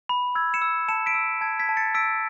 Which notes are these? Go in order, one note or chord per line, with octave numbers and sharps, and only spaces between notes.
B5
E6 G#6
C#7 E7
E6
A5 C#7 E7
B6 D7
E6
A5 G#6
G#6 B6
A5
A6 C#7
E6 B6 D7